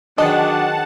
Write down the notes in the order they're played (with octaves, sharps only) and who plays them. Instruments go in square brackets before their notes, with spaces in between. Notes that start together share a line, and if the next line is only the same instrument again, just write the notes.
[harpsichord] D#3 G#4 B4 [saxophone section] F#3 D4 [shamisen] D#5 [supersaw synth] F#5 A5